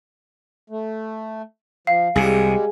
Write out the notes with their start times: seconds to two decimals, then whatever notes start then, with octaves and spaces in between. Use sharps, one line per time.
0.70 A3
1.87 F3 F5
2.16 C2 C3 G3 G#3 G#4